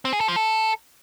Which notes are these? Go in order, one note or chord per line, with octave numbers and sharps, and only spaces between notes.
C4
G#4
A4
F3
A4